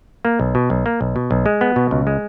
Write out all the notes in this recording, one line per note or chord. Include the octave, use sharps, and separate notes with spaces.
A#3
B1
B2
B1
A#3
B1
B2
B1
G#3
B3
B2
C#2
G#3